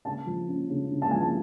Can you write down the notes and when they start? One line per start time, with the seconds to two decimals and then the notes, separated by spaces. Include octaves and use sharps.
0.05 C#3 A5
0.26 F3
0.48 C#4
0.70 C#3
0.91 C#3
1.02 A5
1.11 F3 G#5
1.20 A5